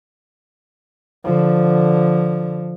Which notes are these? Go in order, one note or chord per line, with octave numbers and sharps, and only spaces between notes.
D3 F3